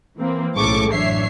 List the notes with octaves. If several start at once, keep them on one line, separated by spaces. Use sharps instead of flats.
E3 A#3 C4
B1 A2 C#3 A4 C#6 D6
A1 F#2 D4 C#5 E5 C7